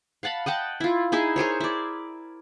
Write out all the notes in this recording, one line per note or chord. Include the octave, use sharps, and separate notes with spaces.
F5 F#5 A5 B5
D#5 F#5 G5 A5
E4 F4
D#4 E4 G#4 E5
G#4 A#4 C5 C#5
E4 D5